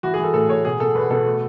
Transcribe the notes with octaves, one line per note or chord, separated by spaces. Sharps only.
E3 F#4
G#4
E3 A4
A2 A4
A2 C#5
B2 G#4
B2 A4
E2 B4
B2 A4
A3